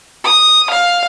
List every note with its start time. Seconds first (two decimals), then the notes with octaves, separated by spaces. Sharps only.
0.24 D#6
0.70 F5